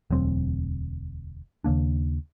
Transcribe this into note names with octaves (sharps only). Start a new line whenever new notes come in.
E1 D2 F#3 C4
D#2 C#3 A#3 D4